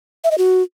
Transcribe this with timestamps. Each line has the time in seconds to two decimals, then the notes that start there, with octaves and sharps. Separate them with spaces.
0.24 E5
0.31 D#5
0.38 F#4